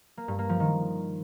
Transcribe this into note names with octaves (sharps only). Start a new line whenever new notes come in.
A#3
G2
A#3
F3
D#3